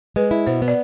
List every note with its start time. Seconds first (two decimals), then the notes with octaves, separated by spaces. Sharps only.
0.16 G#3 B4
0.31 E4
0.47 B2 C5
0.62 B3
0.68 D5